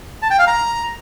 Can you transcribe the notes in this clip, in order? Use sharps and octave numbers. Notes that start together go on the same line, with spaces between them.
A5
G5
F5
A#5